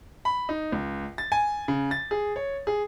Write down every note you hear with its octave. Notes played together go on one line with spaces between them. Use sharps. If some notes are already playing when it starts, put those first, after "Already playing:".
B5
D#4
C#2
A6
G#5
C#3
A6
G#4
C#5
G#4